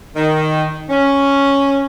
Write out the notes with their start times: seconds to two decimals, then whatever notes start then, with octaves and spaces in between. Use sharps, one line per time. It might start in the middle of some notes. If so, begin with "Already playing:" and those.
0.16 D#3
0.90 C#4